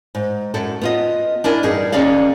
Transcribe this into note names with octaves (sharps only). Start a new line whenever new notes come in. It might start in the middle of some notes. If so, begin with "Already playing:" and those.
G#2
F#2 A4
B3 F4 D#5
D4 E4 A#4 G#5
E2 G2 D#4 G#4
D#2 C#4 G#4 D5 F5